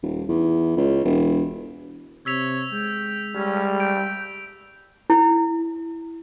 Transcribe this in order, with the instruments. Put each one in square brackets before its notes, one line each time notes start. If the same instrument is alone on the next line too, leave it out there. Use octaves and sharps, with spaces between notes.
[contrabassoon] D#1
E2
C#2
E1
[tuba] C3 [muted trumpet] C#5 [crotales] E6 B6 F7
[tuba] G#3 [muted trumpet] G5
[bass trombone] G3 [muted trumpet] C#4
[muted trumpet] G5 [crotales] D7
[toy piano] E4